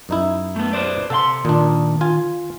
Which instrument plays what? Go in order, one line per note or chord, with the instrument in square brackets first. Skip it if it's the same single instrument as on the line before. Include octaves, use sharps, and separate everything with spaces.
[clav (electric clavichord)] F#2 D#4 E4
[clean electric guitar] A3 B3
B4 C5 D5
[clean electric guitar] C3 F5 C6 [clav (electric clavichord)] A4
[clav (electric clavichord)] A#2 D4 [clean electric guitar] D#3
[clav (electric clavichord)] F4 G#5